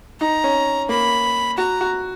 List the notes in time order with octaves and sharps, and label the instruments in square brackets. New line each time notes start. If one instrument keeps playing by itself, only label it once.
[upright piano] D#4 [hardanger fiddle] A#5
[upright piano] C#4
[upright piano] A#3 [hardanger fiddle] B5
[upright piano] F#4 [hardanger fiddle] A#5
[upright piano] F#4